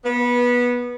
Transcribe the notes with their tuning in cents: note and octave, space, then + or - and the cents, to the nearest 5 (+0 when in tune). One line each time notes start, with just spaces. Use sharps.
B3 -20